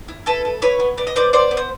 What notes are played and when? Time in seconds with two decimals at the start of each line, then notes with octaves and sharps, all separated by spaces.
0.08 E4
0.26 E4 A4 B4
0.45 A4
0.62 E4 B4 C#5
0.80 B3
0.97 B3 D5
1.07 D#5
1.16 B3 C5 D5
1.33 B3 C5 D5
1.51 B3
1.57 C5